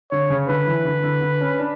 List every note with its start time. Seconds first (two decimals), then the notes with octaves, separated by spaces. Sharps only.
0.11 D3 C#5
0.30 C#3
0.48 D3 B4
0.67 E3
0.85 D3
1.04 D3
1.21 D3
1.41 C#4
1.58 D4